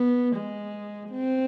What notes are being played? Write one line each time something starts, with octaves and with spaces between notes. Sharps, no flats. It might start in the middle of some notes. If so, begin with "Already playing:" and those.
Already playing: B3
G#3
C4